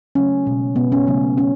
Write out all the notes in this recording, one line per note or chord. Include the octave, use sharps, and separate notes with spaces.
C#3 F#3 A3 C#4
B2 G#3
B2 G#3 B3
C#4
C#3 F#3 A3 B3
C#3 F#3 C#4